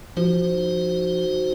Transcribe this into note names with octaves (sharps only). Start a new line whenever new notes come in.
F3 D#4 F#4 C5